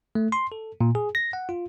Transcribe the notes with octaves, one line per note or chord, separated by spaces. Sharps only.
A3
C6
A4
A#2
G#4
A#6
F#5
F4